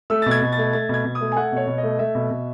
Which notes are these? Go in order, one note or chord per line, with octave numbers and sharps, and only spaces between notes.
A3 E6
B2 A6
G#6
B2
A6
A3
A3 A6
B2 G#6
B2
D#6
A3
G#5
A3 F#5
B2 C#5
B2
D#5
A3
A3 E5
B2
B2